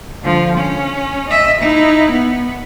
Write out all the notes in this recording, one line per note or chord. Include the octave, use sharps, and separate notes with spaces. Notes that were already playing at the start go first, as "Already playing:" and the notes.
D3 F3
C#4
D#5 E5
D#4 E4
B3